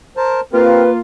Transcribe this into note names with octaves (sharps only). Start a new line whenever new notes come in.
A#4 C5 A5
A#3 C4 F4 G4 A#4 B4